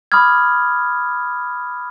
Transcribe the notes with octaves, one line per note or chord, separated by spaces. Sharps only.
B5 D6 D#6 F6 G#6